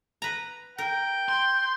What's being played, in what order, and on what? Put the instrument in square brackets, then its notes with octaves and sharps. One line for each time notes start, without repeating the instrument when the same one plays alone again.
[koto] B4 A#5
[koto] A#4 [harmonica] G5
[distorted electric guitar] C6 [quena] G6